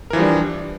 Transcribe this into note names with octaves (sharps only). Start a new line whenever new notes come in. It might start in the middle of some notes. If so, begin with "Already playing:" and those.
E3 F3 G3 D4 A#4